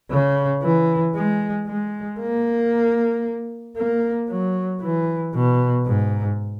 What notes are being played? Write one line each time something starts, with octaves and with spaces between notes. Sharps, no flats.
C#3
E3
G#3
G#3
A#3
A#3
F#3
E3
B2
G#2